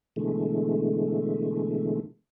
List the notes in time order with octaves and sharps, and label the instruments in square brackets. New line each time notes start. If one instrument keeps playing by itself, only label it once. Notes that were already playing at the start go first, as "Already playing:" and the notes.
[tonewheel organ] B2 D3 E3 G#3 A3